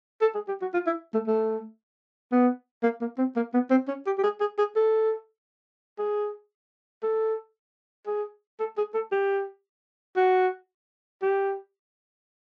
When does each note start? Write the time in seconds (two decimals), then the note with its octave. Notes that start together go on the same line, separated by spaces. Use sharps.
0.22 A4
0.35 G#4
0.48 G4
0.62 F#4
0.74 F4
0.87 E4
1.14 A3
1.27 A3
2.32 B3
2.83 A#3
3.01 A#3
3.18 C4
3.36 A#3
3.54 B3
3.71 C4
3.89 C#4
4.07 G4
4.18 G4
4.24 G#4
4.40 G#4
4.59 G#4
4.76 A4
5.99 G#4
7.03 A4
8.07 G#4
8.60 A4
8.78 G#4
8.95 A4
9.12 G4
10.17 F#4
11.22 G4